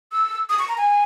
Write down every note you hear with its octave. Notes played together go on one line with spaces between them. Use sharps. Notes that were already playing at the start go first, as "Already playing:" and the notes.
E6
D#6
C#6
A#5
G#5